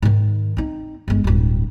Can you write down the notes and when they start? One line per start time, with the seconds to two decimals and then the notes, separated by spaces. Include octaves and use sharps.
0.02 G#2 D#3
0.57 C4 D#4
1.08 G1 G#3
1.24 D1 G2